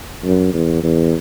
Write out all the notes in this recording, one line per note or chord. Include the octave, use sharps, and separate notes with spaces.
F#2
E2
E2